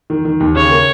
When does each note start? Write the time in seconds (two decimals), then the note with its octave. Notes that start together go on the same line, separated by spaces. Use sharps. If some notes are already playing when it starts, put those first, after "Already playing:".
0.10 D#3
0.25 D#3
0.40 D#2
0.56 C#3 C#5
0.71 A#3